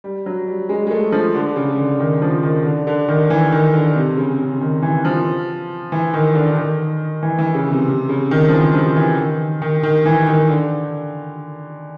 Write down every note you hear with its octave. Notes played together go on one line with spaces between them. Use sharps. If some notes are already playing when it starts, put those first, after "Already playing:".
G3
F#3
G3
G#3
G#3
A3
F3
D3
C#3
D3
D#3
F3
D#3
D3
D3
D#3
E3
D#3
D3
C3
C#3
C#3
D#3
E3
F3
E3
D#3
D3
D3
D#3
E3
E3
C#3
C3
C3
C#3
D#3
F3
E3
F3
E3
D#3
D#3
D#3
E3
D#3
D3